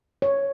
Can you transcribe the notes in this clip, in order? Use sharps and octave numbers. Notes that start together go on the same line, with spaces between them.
C#5